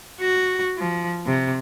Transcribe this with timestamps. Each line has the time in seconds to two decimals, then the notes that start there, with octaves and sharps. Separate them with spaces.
0.20 F#4
0.78 F3
1.26 C3